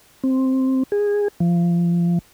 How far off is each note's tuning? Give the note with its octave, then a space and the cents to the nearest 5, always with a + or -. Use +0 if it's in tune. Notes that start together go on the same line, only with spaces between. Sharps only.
C4 +5
G#4 -15
F3 -20